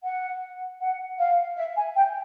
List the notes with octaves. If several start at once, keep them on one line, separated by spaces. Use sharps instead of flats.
F#5
F#5
F5
E5
G#5
G5